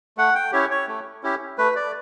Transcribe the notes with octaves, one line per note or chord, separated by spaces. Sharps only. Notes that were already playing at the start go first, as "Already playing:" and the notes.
A3 F#5
G5
C#4 E4 G4 C#5
C#5
A3
C#4 E4 G4
A3 B4
D5